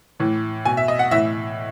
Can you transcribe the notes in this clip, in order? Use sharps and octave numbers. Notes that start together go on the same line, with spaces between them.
A2 E3
B2 G#5
E5
D#5
F#5
A2 E3 E5